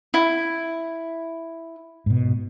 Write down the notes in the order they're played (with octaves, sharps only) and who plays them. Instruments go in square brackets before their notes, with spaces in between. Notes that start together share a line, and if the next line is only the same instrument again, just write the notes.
[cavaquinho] E4
[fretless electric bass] G#2 B2